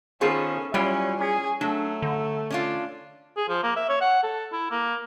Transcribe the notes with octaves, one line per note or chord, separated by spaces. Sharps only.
D#3 B3 C#4 F4 G#4 A4 C5
F#3 G3 C#4 E4 F4 G4
C#4 G#4
F#3 A3 D4
D3
C#4 D4 F4
G#4
F3
A#3
E5
C#5
F#5
A4
E4
A#3